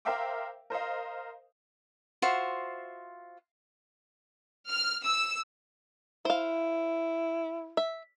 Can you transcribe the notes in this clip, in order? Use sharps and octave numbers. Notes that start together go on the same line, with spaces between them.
A#4 C5 E5 F5 G5 D6
A#4 C5 D#5 F5
F4 F#4 C5 E5
F6
E6
E4 C5 F5
E5